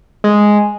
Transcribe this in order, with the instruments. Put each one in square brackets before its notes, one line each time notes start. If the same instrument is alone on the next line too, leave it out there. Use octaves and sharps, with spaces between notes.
[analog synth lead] G#3